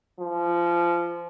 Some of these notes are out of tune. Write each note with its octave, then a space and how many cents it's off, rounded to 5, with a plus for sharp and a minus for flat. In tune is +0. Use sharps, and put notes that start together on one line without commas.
F3 -20